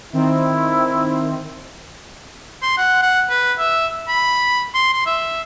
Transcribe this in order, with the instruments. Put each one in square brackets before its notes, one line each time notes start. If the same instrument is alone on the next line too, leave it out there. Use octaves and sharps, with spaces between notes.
[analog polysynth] D#3 C4 [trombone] E4
[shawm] C6
F#5
F#5
B4
E5
B5
C6
C6
E5